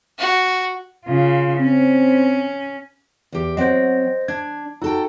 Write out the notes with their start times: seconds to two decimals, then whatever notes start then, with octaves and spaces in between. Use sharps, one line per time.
0.19 F#4
1.06 C#3 F4
1.58 C4 C#4
3.32 E2 G4
3.57 F#3 C4 C5 D#5
4.28 D4 G#6
4.82 D#4 F#4 A4 G5